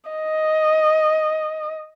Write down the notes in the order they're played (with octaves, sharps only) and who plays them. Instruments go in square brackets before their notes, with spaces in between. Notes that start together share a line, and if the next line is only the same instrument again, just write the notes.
[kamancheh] D#5